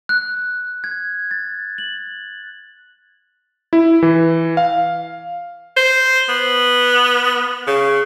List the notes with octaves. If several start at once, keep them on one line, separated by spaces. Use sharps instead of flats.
F#6
G#6
A6
F#7
E4
E3
F5
C5
B3
C#3